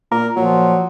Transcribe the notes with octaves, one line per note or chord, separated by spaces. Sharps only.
A#2 A#4
A#2 F3 F#3